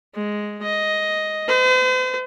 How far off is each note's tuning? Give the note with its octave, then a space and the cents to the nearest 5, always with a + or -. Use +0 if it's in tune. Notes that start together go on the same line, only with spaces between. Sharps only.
G#3 +0
D#5 +5
C5 -45